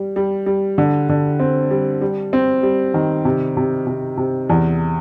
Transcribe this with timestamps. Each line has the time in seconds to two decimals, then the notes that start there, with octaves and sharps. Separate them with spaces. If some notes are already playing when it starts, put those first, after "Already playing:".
Already playing: G3
0.16 G3
0.46 G3
0.78 D3
1.09 D3
1.40 C4
1.71 G3
2.01 G3
2.33 C4
2.63 G3
2.94 D#3
3.25 C3
3.57 C3
3.87 C3
4.17 C3
4.49 E2